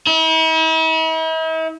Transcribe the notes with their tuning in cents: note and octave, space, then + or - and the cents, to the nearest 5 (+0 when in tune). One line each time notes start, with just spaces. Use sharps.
E4 -45